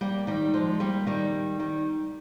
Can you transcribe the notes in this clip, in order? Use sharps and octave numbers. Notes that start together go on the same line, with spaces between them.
G3 A#3
D#3 G3
F3 G#3
G3 A#3
D#3 G3
D#3 G3